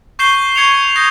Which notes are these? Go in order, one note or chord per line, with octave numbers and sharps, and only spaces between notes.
C#6 G6 C7 E7 G7
C#6 G#6 C#7 E7 F7
D#6 G6 A#6 E7 F7